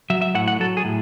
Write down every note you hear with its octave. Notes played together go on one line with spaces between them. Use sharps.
F#3 E5
E5
A2 F#5
F#5
F#3 A4
G#4
A2